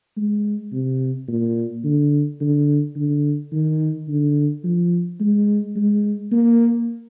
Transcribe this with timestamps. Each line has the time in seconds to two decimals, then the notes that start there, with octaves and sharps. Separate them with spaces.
0.17 G#3
0.72 C3
1.28 A#2
1.84 D3
2.40 D3
2.96 D3
3.52 D#3
4.08 D3
4.64 F3
5.20 G#3
5.76 G#3
6.32 A#3